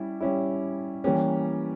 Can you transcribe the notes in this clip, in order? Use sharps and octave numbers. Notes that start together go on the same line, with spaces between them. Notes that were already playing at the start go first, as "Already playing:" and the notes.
Already playing: G3 C#4 E4
G3 C#4 E4
E3 G3 A#3 C#4 G4